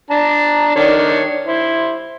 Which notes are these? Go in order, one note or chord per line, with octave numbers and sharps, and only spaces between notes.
D4 A5 A#5
D#3 D4 C#5
E4 C5